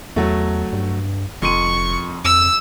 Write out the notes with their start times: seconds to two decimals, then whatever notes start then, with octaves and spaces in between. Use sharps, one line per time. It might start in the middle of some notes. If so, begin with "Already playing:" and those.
0.16 E2 F#3 A3
0.73 G2
1.42 F1 F2 C6 C#6 D#7
2.25 F2 E6